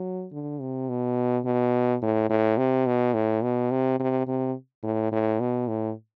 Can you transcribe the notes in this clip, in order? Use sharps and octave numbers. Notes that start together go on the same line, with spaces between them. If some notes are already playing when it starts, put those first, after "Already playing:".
Already playing: F#3
D3
C3
B2
B2
A2
A2
C3
B2
A2
B2
C3
C3
C3
A2
A2
B2
A2